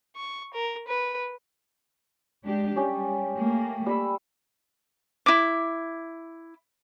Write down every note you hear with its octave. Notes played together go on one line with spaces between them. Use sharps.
C#6
A#4
B4
G#3 D4 G4
G3 C#4 G4
A3 A#3
G3 B5 E6
E4 D6